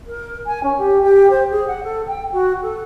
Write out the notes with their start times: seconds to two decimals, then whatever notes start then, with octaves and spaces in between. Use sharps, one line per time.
0.06 A#4
0.46 G#5
0.63 C#4
0.77 G4
1.02 G4
1.30 C5
1.50 G#4
1.67 F#5
1.83 A4
2.07 G5
2.32 F#4
2.62 A4